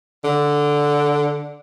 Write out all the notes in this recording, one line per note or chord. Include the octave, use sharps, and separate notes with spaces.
D3